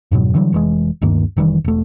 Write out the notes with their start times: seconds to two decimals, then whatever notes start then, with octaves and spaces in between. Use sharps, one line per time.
0.11 F2 G#2 B2 F#3
0.35 D3 E3 F#3 G3
0.52 F1 E3 G#3
1.01 D2 G2 D#3 A#3
1.37 F1 D#3 E3 G3
1.64 E1 A3